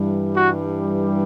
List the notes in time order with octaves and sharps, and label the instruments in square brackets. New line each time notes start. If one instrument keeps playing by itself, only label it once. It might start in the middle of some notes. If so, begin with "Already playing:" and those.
Already playing: [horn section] G2 E3 G3
F#4